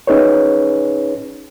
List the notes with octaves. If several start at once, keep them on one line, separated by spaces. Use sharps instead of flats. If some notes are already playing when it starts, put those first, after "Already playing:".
C#4 D#4 G#4 B4 C#5